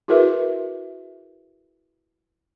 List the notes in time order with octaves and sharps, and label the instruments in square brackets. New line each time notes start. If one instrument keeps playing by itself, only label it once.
[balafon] E4 F#4 G#4 A#4 B4 E5